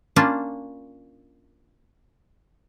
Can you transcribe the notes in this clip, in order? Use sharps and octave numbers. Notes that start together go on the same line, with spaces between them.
A#3 C#4 D4 F4